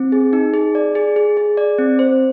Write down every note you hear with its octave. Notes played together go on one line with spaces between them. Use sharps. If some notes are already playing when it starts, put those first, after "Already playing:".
Already playing: C4
G#4
D#4
G#4
D5
G#4
G#4
G#4
D5
C4
C5